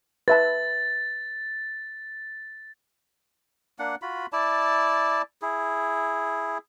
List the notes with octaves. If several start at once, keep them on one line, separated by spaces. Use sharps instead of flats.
B4 E5 A5 A6
A#3 D4 F#5
F4 F#4 B5
E4 D5 A5
E4 G#4